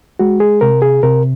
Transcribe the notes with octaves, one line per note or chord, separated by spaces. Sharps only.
G#3 F#4
G#4
C3 A#4
G#4
C3 A#4